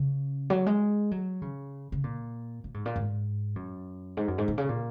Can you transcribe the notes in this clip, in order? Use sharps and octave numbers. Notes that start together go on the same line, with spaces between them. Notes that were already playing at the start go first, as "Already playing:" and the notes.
Already playing: C#3
F#3
G#3
F#3
C#3
C#3
A#2
A#2
G#2
A#2
G#2
F#2
G#2
F#2
G#2
A#2
C#3
A#2